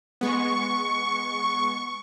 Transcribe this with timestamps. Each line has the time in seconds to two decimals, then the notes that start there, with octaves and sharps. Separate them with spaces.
0.21 G#3 B3 C#6